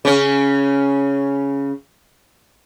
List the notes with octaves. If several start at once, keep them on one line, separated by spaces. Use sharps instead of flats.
C#3 C#4